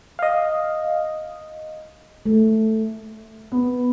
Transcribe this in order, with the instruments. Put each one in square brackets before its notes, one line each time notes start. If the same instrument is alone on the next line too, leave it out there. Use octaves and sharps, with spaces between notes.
[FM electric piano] D#5 F5
[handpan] A3
[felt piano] B3